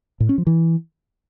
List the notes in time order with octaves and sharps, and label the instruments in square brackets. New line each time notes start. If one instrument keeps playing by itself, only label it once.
[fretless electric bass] A2
C#4
F3
E3